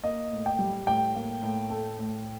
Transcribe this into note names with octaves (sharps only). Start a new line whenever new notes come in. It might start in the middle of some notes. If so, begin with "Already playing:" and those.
A#3 D#5
A2
G5
G3
A2 G5
A#3
A2
A3
A2